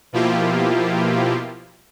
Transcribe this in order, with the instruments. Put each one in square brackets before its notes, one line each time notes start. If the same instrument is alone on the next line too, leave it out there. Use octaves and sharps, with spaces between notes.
[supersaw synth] B2 F3 A#3 E4 F4 G4